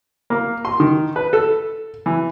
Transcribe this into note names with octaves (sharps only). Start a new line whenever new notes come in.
A#3
C6
D#3
B4
A4
E3